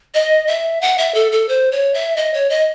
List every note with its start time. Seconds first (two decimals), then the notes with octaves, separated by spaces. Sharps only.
0.14 D#5
0.47 E5
0.81 F#5
0.98 E5
1.14 A4
1.32 A4
1.49 C5
1.72 C#5
1.94 E5
2.17 D#5
2.34 C#5
2.50 D#5